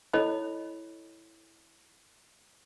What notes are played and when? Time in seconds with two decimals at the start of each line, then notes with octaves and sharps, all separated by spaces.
0.13 E4 A4 C#5 D#5 B5